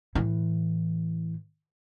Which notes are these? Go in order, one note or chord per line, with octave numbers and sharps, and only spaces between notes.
A2 E3